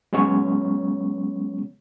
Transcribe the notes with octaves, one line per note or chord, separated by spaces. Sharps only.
F#3 G#3 B3 C#4 C#5